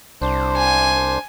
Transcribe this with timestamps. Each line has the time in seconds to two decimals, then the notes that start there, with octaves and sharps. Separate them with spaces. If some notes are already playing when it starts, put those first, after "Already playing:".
0.22 C2 D4 C5
0.57 G#5